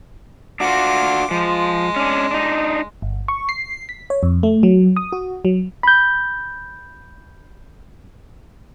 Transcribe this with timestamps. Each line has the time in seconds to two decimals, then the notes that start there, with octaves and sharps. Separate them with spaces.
0.60 D4 F4 F#4 D6
1.31 F3 G#3
1.96 C#4 D4
2.31 D4 D#4
3.02 G1
3.28 C#6
3.49 C7
3.89 B6
4.10 C#5
4.23 F2
4.43 A3
4.63 F#3
4.96 D#6
5.12 F#4
5.45 F#3
5.83 B5 G6